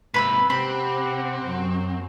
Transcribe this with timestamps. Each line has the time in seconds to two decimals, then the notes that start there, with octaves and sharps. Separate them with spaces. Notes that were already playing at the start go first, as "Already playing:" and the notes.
0.14 G#2 C3 B4 B5 E6
0.50 C3 C4 G4 F#5 B5
1.44 F#2 F#3